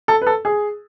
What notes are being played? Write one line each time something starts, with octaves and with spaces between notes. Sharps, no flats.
A4
B4
A4
G#4